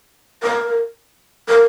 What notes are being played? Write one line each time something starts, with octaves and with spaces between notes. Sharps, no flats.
A#4
A#4